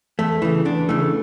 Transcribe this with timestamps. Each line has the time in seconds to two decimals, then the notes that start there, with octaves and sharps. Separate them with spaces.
0.19 E2 A3
0.42 C#3 E3
0.65 E2 D4
0.89 C#3 E3 A3